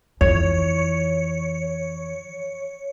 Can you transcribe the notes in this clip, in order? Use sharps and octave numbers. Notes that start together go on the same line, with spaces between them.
F2 E3 C#5